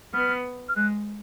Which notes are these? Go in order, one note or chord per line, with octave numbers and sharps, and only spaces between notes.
B3 F6
F6
G#3 F#6